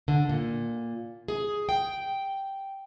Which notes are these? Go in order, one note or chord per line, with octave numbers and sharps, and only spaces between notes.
D3
A#2
G#4
G5